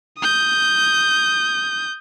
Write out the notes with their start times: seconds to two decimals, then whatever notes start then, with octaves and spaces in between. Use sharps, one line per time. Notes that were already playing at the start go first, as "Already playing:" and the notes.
0.19 D#6 G6